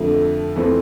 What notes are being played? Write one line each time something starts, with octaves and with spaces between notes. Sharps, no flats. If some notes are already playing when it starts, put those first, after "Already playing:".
Already playing: F2 D3 A3
F2 E3 A3 C4